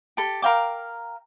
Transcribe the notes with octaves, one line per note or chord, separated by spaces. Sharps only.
G4 A4
A#4 F5 G5 D6